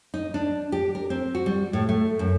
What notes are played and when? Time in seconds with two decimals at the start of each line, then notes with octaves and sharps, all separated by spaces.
0.14 D#4
0.34 D4
0.72 G4
0.95 A#4
1.10 C4
1.35 F#4
1.46 G3
1.73 A2
1.89 A3
2.19 F#2